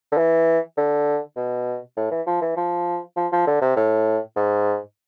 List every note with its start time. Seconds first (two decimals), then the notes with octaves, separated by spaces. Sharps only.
0.12 D3
0.17 E3
0.77 D3
1.36 B2
1.97 A2
2.11 E3
2.27 F3
2.42 E3
2.57 F3
3.17 F3
3.32 F3
3.47 D3
3.61 C3
3.77 A2
4.36 G#2